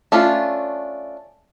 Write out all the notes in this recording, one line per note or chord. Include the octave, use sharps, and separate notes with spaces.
A3 C#4 D4 F4